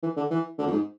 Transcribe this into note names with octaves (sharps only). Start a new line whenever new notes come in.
E3
D3
E3
D3
F2
G#2